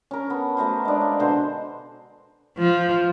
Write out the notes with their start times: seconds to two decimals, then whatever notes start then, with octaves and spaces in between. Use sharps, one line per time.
0.11 C#4 A#4
0.30 B3 A4
0.57 F#3 A3 A#4 C5
0.85 G#3 D4
1.01 F5
1.19 B2 D3 A4 C5
2.58 F3